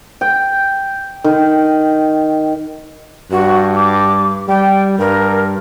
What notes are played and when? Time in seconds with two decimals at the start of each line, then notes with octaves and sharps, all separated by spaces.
0.21 G5
1.24 D#3
3.31 G2 F#4
3.76 D6
4.48 G3 G5
4.99 G2 A#4